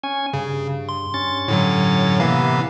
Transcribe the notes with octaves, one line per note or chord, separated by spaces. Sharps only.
C#4 G#5
G2 C#3
C6
G2 C#4 A6
A2 D3 F#3
C3 E3 A#3 B3 E4 F5